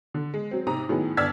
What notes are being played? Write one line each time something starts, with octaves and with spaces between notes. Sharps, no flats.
D3
G#3
F#3 C4
G#2 C3 A#5 D#6
A2 D#3 F#3 B3 G#4
G1 D5 E6 F6 G#6 B6